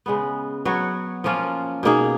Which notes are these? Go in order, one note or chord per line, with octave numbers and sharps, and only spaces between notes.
C#3 G#3 B3
F#3 B3 F#4 C#5
F3 A#3 C#4 F4
B2 A#3 D#4 G#4